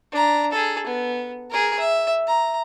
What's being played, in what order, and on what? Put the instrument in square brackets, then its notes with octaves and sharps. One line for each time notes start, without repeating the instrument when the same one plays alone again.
[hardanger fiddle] D4 A#5
G#4 A4
B3
G#4 A#4
E5
A#5